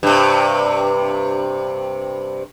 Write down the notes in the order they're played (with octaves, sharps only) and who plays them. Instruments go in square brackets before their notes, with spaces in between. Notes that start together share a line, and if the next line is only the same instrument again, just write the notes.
[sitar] G2 C3